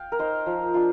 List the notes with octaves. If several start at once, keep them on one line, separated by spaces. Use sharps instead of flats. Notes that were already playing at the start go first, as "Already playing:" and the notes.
Already playing: F5 G5
A#4
D#4 C5
F3
D4 F4